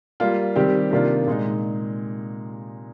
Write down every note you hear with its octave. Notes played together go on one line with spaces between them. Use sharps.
G3 A#3 F4
D#3 G3 C4 G4
C3 D#3 A#3 D4 F4
A#2 G#3 D#4